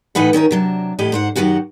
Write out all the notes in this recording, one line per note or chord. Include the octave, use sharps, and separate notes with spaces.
A2 E3 D#4 B4 F#5
D#3 C#4 D#4 A#4
C3 F#3 D4
E2 A2 G4 D#5
G#2 C5 F#5
F#2 D#3 F3 F#4 G4 F#5